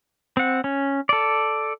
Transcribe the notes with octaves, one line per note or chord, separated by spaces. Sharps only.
C4 F#5
C#4
A4 D5